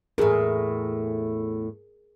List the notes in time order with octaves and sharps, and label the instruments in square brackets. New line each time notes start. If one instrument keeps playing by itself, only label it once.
[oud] E2 A2 [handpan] G#4 A#4